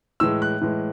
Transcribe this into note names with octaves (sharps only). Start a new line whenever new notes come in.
A2 E3 G#3 E6
F#6
A2 E3 G#3